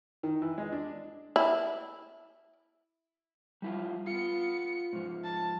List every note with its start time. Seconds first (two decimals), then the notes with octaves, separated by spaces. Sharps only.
0.23 D#3
0.42 E3
0.58 G#3
0.72 D4
1.36 E4
3.62 G3 E4 F4
4.07 B3 F4 C#7
4.93 G#2 F3
5.24 A5